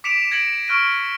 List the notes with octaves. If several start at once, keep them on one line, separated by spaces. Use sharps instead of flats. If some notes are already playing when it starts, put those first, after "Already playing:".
D6 B6 C#7 D7 E7 F7
G#6 A#6 C#7 D7 F#7
C#6 F6 F#6 A#6 D7 D#7